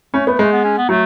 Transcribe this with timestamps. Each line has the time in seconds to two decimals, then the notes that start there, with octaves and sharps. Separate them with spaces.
0.14 A3 C#4
0.27 A3 B3
0.39 G#3 A3
0.52 B3
0.64 C#4
0.77 B3
0.89 F#3 A3